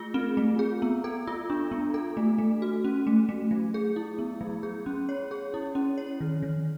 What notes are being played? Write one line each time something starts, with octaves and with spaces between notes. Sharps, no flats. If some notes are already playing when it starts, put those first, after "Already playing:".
Already playing: A3 F4 G#4
C4
A3
G#4
B3
A4
F4
D4
B3
A4
A3
A3
F#4
C#4
A3
A3
F#3
G#4
E4
B3
F#3
G#4
C#4
C#5
G#4
E4
C#4
C#5
D#3
D#3